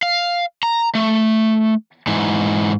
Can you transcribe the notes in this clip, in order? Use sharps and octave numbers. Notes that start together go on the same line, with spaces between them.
F5
A#5
A3
G#2 E3